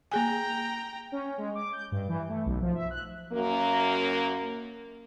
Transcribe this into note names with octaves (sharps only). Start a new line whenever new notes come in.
A#3 G#4 G5 G#5 A#5
C#4
G#3
D6
G6
G2
E3
A3
B1
F3
E5
F#6
F#2 A#3